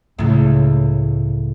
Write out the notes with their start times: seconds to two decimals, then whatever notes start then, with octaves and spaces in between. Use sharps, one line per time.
0.18 C#2 A2